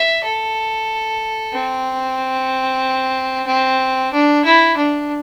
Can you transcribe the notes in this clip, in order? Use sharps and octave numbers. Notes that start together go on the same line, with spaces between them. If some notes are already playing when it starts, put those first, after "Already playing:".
Already playing: E5
A4
C4
C4
D4
E4
D4